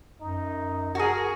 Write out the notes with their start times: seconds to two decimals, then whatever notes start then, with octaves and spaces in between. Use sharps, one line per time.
0.21 F#2 D#4
0.95 F#4 G#4 A#4